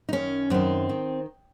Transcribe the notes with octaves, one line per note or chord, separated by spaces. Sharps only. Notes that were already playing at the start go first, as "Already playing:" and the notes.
D#4
F#2 D#3 C#4
F#2 D#3 C4
D#3